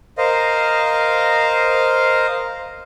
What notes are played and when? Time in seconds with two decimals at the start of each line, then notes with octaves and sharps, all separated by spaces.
0.18 A#4 C5 D#5 F5